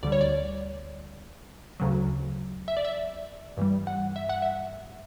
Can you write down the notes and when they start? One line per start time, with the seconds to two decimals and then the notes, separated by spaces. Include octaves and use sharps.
0.03 D2 D3 G3 D5
0.12 C#5
0.21 D5
1.80 D2 C#3 F#3
2.68 E5
2.77 D5
2.85 E5
3.57 G2 E3 G3
3.87 F#5
4.16 E5
4.29 F#5
4.42 E5